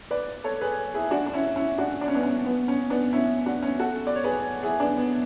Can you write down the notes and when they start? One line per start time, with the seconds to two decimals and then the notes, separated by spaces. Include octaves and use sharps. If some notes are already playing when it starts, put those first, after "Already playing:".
0.11 B4 D5
0.44 A4 C#5
0.61 G#4 B4
0.94 E4 G#4
1.11 D4 F#4
1.26 D4
1.34 C#4 E4
1.56 C#4 E4
1.78 D4 F#4
2.01 D4
2.08 C#4
2.15 B3 D4
2.23 C#4
2.46 B3
2.68 C#4
2.90 B3 D4
3.13 C#4 E4
3.46 D4 F#4
3.63 C#4
3.80 F#4 A4
4.07 D5
4.15 C#5
4.24 G#4 B4
4.63 E4 G#4
4.80 B3 D4
4.97 B3